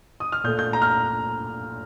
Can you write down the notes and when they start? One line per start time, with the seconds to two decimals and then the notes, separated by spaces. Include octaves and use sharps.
0.20 D#6
0.32 F6
0.44 A#2 A3 G6
0.59 G6
0.73 A#5
0.82 F6